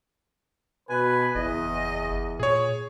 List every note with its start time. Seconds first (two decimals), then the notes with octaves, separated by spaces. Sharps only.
0.89 B2 B4 G#5
1.35 F#1 E2 D#5
2.40 A#2 G#4 C#5